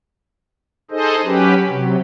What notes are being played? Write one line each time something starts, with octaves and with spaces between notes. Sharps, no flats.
D#4 G#4 A4 C5 D#5
F#3 C#4 G4 B4
C3 F#3